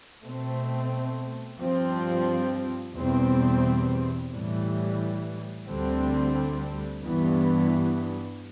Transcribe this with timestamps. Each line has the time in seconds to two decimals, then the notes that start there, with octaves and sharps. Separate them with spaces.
0.22 B2 A3 C4
1.59 G2 F3 C4
2.94 E2 B2 G3 C4
4.30 A2 E3 G3
5.67 D2 D3 G3 C4
7.03 G2 E3 B3